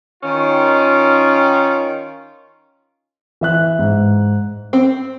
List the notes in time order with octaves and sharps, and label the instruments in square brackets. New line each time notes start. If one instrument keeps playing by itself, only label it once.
[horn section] D#3 C#4 F4
[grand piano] E3 E5 F#6
G#2
[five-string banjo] C4